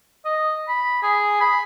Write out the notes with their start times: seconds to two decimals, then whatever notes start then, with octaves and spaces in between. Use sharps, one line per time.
0.25 D#5
0.68 B5
1.03 G#4
1.41 B5